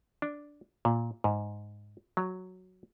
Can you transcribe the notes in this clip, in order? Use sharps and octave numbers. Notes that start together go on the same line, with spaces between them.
D4
A#2
G#2
F#3